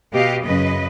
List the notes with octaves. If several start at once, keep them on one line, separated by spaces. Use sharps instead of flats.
B2 G4 D#5 F5
F#2 C#3 B4 D#5